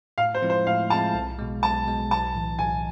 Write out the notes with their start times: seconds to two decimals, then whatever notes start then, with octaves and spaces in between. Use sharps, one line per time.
0.18 A2 F5
0.34 C5
0.42 F3 G#3 C4 E4
0.50 C5
0.67 A2 F5
0.90 F3 G#3 C4 E4 A5
1.14 B1
1.39 B2 G#3
1.63 B1 A5
1.86 B2 G#3
2.11 B1 A5
2.35 A2 E3
2.59 B1 G#5